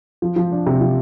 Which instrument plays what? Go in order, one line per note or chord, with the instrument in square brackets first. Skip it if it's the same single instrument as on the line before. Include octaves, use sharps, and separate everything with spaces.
[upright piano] F3
F3
D4
C3
F3